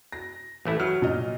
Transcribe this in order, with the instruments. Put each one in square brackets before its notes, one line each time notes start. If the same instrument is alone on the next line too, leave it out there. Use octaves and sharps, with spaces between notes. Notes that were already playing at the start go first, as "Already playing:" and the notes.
[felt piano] A#6
[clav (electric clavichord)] A1 A3 E4
[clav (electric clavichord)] F#3 [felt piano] F6
[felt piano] A#2 D#5